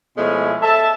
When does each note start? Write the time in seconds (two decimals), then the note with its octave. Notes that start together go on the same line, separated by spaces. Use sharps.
0.17 B2 F3 G#3 A3 C#4 E4
0.62 A4 E5 A5